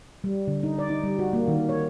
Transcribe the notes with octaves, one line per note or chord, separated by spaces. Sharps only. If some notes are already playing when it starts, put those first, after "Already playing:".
G3
D3
D#4
D5
D#4
G3
F#4
A#3
D#3
C#5